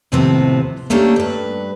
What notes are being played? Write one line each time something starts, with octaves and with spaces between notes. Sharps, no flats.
D#2 A2 C3 F3 B3 C4
A3 A#3 C#4 D4 G4 A4
G2 B4